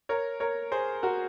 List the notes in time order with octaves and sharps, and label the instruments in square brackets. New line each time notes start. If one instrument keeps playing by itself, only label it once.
[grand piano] A#4 C#5
A#4 C#5
G#4 C5
F#4 A#4